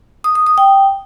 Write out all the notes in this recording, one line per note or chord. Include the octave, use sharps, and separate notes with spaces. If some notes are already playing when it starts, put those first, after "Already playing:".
D#6
D#6
D#6
G5